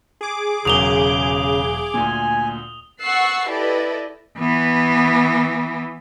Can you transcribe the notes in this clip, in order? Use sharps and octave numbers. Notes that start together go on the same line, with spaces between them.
G#4 D6
E1 C#3 F#3 A#4 D#6 F7 G7
D2 A#2 G#5
F#5 C#6 E6 F#6 A6 C7
E4 G4 A4 B4 D5 D#5
E3 B3